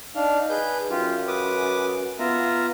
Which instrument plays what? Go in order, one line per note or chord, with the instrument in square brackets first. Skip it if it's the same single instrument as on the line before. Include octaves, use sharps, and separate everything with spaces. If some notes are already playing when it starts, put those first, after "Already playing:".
[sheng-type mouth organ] D4 F5 [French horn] D#4
[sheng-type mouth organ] G#4 B4 G6
[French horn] F#2 [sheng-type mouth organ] F4 G4
[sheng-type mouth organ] B4 D6 D#6
[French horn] B3 [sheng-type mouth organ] F4 E5 A#5